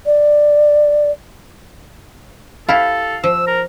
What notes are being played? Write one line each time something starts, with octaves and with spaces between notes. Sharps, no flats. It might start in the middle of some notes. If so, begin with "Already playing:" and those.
D5
E4 G4 A4 F5
F3 E6
A#4